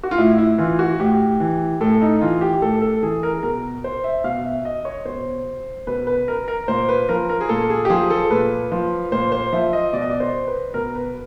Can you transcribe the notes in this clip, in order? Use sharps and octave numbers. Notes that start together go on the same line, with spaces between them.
F#4
F4
A2 E4
E4
E3 F4
F#4
A2 G4
E3
A2 A4
D#4
E3 F4
G4
A2 A4
A4
E3 G#4
A#4
B2 A#4
C5
E5
B2 F5
E5
D#5
C#5
B2 C5
B2 B4
B4
A#4
A#4
A#2 C5
B4
F3 A#4
A#4
G#4
A#2 A4
G#4
G4
F3 G#4
A4
A#2 B4
F3
A#2 C5
C5
F3 E5
D#5
B2 D5
D#5
D5
C5
B4
B2 A#4
B4